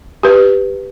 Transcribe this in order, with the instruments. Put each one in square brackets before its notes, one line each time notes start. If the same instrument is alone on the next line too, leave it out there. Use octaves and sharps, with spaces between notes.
[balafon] G4 B4